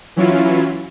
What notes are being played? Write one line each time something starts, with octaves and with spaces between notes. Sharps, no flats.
E3 F#3 C#4 E4 F4